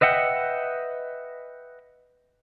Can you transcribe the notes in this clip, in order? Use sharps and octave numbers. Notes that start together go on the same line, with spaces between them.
B4 D#5 E5 F#5 G5